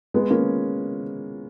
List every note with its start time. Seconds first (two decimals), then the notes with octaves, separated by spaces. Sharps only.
0.14 G#3 B3
0.30 A#3 C#4